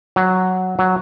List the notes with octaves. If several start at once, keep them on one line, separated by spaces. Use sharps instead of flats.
F#3
F#3